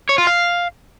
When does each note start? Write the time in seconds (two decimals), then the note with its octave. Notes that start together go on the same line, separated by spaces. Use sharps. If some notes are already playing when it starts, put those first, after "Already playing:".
0.09 C#5
0.18 F4
0.27 F5